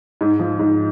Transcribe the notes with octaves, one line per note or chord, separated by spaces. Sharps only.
G#2
F3
G#2